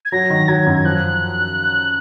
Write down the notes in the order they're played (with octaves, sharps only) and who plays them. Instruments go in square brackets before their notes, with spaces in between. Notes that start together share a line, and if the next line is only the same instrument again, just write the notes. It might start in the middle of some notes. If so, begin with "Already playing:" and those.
[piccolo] G#6
[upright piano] F#3 [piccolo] A#6
[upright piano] D#3
[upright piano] F#3 [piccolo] G#6
[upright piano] F#2
[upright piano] F3 [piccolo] F#6